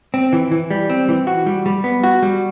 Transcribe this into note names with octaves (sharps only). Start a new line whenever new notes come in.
C4
E3
E3
G3
C4
E3
F#4
G3
G3
B3
F#4
G3